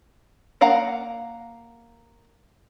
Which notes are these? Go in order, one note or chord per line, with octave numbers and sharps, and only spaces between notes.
A#3 F5 F#5 A#5